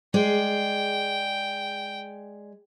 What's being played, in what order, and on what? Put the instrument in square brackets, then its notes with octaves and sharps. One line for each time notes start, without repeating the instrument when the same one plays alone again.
[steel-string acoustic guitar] G#3 G#4 D5 [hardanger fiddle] G5